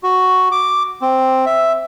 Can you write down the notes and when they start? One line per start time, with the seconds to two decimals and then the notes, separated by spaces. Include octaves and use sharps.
0.03 F#4
0.52 D6
1.02 C4
1.46 E5